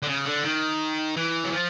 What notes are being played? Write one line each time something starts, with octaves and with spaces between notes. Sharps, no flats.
D3
C#3
D3
D#3
E3
F#3
F3